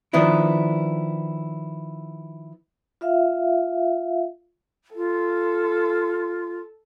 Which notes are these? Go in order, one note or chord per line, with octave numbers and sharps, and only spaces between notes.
D#3 F3 B3 D4 E4
F4 E5 F5
F4 A4